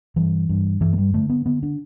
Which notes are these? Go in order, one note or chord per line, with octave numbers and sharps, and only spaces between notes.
G2 E3
G2
G2 E3
A3
G3
D3 A3
B3
D3 B3
D4